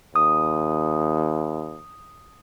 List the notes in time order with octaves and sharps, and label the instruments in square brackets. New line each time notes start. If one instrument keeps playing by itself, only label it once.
[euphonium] D#2 [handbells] D#6